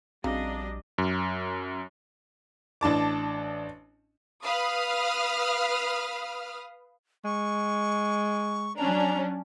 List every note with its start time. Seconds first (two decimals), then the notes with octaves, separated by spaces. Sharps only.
0.24 A#1 C#3 G3 C4 D4 F#4 D#5 A#5
0.98 F#2
2.81 A1 D4 A5 D6
4.44 B4 F5 D#6 F6
7.25 G#3 C#6
8.77 F#3 C#4 D4 A#5